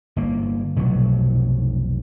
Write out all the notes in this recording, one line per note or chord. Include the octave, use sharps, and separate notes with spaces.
G1 A#3
F1 B1 B2 F#3